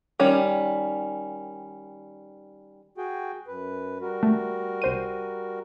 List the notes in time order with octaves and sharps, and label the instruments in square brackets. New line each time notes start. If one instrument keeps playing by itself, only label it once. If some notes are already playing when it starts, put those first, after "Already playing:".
[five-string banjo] D#3 G3 C#4
[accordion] F#4 G#4 G5
F#2 B4
G3 F#4 A#4
[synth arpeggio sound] A3
C2 C5 D#7